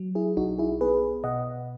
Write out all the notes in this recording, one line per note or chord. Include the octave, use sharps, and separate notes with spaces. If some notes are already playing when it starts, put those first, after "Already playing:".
Already playing: F#3
E4 G#4
B1 D#4 F#4
E4 G#4
B3 G#4 B4
B2 D#5 F#5